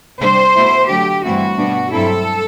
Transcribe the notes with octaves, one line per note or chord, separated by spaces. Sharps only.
C3 G3 D4 C5
B2 A3 E4
D3 F#3 A3 G4
G2 E3 A3 C4 E4 F#4
B2 G3 B3 D4
G2 F#3 C4 E4 A4